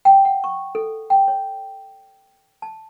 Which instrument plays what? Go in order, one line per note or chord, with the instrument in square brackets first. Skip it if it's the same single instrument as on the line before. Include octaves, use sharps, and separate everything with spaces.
[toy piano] G5
F#5
C#6
A4
G5
C#5
A5